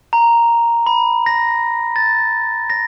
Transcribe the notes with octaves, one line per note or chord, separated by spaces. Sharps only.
A#5
B5
A#6
A6
A#6